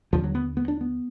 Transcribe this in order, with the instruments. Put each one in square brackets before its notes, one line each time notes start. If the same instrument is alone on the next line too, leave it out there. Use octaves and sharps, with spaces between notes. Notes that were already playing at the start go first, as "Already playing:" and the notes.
[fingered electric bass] D#2 D3 F3
F#3
B3
B3
D4
B3